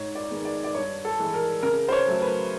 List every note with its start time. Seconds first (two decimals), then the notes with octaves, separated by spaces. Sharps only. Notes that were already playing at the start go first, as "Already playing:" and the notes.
Already playing: G#2 C#5
0.15 D5
0.30 D#3 G#3 B3
0.45 D5
0.64 D5
0.75 G2 C#5
1.05 A4
1.19 E3 G#3
1.34 A#4
1.63 C#3 A#4
1.89 C5
1.92 C#5
2.07 F#3 A3
2.22 B4